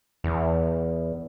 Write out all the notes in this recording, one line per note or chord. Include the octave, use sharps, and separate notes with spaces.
E2